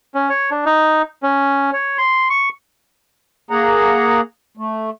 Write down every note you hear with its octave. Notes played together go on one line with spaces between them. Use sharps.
C#4
C#5
D4
D#4
C#4
C#5
C6
C#6
A#3 G#4 F#5 A#5
A3